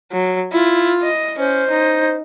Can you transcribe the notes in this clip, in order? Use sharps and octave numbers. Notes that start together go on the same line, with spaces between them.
F#3
E4 F4
D#5
C#4 C5
D#4